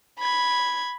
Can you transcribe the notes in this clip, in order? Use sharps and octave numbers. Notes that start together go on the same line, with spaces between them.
B5 G#6